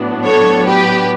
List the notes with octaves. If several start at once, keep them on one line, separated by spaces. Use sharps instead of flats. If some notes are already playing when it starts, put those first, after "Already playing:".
Already playing: A2 F#3 B3 D4
A4 C#5
G4 B4